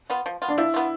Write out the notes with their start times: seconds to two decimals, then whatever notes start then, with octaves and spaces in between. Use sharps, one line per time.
0.10 B3 F4
0.26 F3
0.42 B3 F4
0.48 D4
0.58 F3 E4
0.74 B3 F4